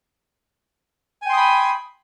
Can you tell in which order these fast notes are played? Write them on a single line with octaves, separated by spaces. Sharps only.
G#5 G5 C6 D#6 B5